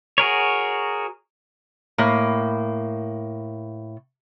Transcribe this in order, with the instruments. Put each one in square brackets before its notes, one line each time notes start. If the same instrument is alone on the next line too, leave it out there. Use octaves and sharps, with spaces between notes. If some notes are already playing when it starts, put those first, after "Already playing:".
[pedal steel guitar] F#4 G#4 A#4 C#5
[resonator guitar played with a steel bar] A2 A#3